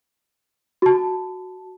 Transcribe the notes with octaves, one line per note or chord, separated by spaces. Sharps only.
F#4 A5